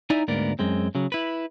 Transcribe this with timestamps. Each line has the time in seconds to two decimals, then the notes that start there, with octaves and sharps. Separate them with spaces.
0.10 D#4 E4 D5 E5 G#5 A#5
0.28 D2 G#2 A#3 B3 A#4 D5
0.59 F#2 G#3 C4
0.95 C#3 F#3
1.12 E4 B4